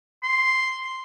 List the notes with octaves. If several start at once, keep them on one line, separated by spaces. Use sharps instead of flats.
C6